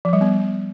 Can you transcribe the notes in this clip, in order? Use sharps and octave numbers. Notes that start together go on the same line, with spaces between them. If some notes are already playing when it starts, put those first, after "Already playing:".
F3
G3
B3